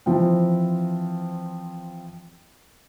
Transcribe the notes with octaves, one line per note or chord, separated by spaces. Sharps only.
E3 F3 C4